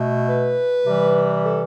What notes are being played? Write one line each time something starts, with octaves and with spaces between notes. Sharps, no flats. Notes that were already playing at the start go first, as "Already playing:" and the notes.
Already playing: B2 A3
B4
C3 E3 G3
A4